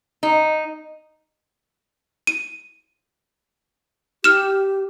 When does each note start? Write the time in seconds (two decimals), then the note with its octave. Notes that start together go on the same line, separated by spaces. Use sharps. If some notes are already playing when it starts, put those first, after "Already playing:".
0.23 D#4
2.27 D#7
4.24 G4 F6 E7